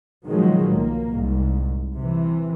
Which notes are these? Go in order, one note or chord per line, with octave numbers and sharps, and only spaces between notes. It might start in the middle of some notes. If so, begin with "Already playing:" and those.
B2 D#3 F3 F#3 G#3
B1 A#3
C2 G#2
C3 E3